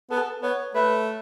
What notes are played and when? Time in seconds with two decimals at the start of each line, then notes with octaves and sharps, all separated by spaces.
0.11 B3 A4
0.42 B3 C#5
0.75 A3 B4